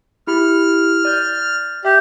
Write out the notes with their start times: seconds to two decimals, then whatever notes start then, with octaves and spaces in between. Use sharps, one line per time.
0.27 E4 G4 B5 F6
1.05 D5 G6
1.85 G4 E5